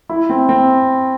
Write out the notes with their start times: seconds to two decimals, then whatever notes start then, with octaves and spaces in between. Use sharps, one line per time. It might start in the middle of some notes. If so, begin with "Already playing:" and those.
0.09 E4
0.30 C4
0.49 C4